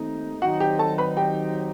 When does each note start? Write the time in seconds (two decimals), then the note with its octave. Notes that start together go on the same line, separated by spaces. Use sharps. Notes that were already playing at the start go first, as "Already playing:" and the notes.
Already playing: D#2 D#3 A3 C4 D#4
0.42 D#3 F#3 C4 D#4 F#4 F#5
0.60 G4 G5
0.79 A4 A5
0.98 B4 B5
1.17 G4 G5